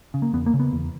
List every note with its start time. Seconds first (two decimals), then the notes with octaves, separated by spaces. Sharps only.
0.14 C#3
0.22 A#3
0.33 E2 B3
0.46 A#3
0.54 C#3
0.60 B3
0.72 E2